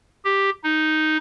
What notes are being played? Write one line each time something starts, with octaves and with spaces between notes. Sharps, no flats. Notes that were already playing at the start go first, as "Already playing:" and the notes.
G4
D#4